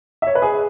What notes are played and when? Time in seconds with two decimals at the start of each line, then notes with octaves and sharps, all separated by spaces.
0.22 E5
0.27 C#5
0.35 B4
0.42 G#4